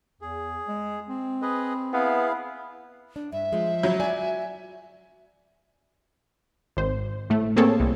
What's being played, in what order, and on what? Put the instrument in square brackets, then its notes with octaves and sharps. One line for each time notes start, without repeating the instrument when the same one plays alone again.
[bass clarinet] E2 [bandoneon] G#4
[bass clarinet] G#3
C4
[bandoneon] G#4 B4 D#5
[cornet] B3 [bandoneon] E4 G#4 F5
[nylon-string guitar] D4
[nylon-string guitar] G2 [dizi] E5
[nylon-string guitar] F3 G#3
[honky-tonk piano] F#3
[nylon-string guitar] F#4 D5 [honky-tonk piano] G#5
[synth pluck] G#1 C5
A2 A3
A#3 C4 G#4 A4 C#5 A5
C2